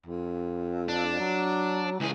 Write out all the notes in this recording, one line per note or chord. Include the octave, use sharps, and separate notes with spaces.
F2
D4
F#3
C#2 E3 G#4